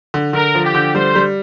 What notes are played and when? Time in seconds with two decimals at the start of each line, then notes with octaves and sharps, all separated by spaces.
0.14 D3
0.33 D3 A#4
0.55 F3
0.64 G4
0.75 D3
0.95 G3 C5
1.15 G3